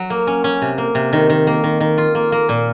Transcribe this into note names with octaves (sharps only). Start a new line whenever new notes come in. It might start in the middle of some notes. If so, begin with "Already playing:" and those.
Already playing: F#3
A#3
C#4
C#4
C3
A#3
C3
D#3
D#3
A#3
D#3
D#3
F4
A#3
A#3
A#2